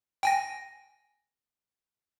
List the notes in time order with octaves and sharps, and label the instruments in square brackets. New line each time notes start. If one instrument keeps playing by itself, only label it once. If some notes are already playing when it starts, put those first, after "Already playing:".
[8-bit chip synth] G5 G#5 A#6